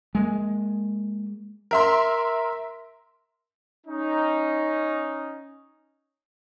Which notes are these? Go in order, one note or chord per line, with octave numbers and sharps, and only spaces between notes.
G#3 A#3
A#4 E5 C6
C#4 D#4